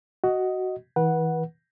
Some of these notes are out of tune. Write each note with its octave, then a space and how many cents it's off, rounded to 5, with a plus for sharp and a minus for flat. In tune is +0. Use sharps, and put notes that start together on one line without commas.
F#4 +10 D#5 +5
E3 -35 B4 -30 F#5 +0